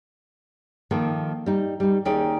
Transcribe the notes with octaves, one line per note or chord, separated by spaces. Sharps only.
D#3 F3 A#3 A4
G3 D#4
G3 D#4
D#2 C#4 D#4 G#4 D5 G5